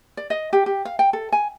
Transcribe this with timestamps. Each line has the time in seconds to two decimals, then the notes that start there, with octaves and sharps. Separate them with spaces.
0.17 D5
0.30 D#5
0.53 G4
0.66 G4
0.85 F5
0.99 G5
1.13 A4
1.32 G#5